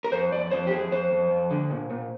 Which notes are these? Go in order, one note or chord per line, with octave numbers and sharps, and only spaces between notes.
A#4
F2 C5
F2 D5
F2 C5
G4
F2 G#4
F2 C5
F2
F2
D3
A#2
A#2